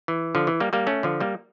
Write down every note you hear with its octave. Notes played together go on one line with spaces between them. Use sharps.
E3
D3 F3
E3
G3 A#3
G3 A#3
A3 C#4
D3 F3
G3 A#3